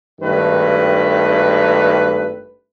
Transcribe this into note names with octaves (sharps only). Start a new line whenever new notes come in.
G#1 G2 D#3 A3 B4